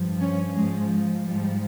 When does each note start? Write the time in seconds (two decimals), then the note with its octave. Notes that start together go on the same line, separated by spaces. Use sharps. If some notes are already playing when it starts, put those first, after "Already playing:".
Already playing: G2 F3
0.21 C#4
0.56 G#2 F3 G#3
1.27 G#2 F3 G3